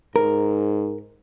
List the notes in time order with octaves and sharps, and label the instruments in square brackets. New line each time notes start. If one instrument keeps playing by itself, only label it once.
[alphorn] G#2 [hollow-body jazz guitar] A#4